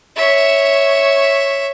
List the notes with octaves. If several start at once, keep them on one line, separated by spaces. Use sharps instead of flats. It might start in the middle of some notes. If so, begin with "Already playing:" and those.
C#5 E5